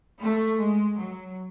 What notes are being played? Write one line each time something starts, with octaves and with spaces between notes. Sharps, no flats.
A3
G#3
F#3